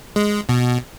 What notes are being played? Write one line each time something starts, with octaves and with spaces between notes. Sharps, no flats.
G#3
B2